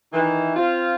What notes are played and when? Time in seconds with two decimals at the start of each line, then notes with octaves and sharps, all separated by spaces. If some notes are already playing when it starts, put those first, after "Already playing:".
0.12 D#3 E3
0.55 C4 F4